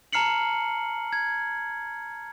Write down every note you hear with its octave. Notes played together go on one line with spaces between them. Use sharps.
A5 A#5 F6 C7 C#7 F#7
G#6